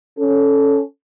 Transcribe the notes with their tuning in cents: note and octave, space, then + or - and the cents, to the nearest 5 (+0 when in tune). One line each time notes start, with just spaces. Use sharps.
C#4 +0 A4 -10